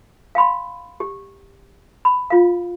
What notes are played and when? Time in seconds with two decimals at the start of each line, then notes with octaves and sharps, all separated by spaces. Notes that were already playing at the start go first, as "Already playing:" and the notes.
0.35 F5 G5 B5 C6
1.00 G4
2.05 B5
2.30 F4 F5